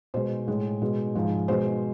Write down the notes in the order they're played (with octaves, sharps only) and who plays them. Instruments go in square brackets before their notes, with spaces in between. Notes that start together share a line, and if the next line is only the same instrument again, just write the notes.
[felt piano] B2 G#3 C5
A2 G#3
B2 G#3
G#2 F3 G#3
B2 G#3 C5